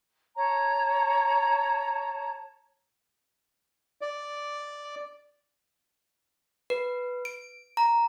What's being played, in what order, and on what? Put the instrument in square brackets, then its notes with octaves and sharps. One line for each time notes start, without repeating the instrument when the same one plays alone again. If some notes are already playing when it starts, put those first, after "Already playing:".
[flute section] C#5 A5 A#5
[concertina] D5
[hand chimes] B4
D7
A#5